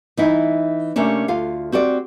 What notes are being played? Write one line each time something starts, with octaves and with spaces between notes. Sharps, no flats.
E3 D#4 E4
C3 A3 A#3 C#4 D4
D2 F4 F5
C4 F#4 G4 D5